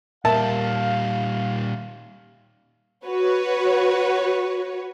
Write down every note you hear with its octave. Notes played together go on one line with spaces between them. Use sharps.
A#2 G3 A#4 E5 F5 A5
F#4 B4 C#5